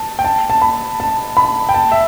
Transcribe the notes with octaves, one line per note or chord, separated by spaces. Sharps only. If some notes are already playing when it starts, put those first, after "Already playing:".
Already playing: A5
G5
A5
A5
B5
A5
B5
G5
A5
E5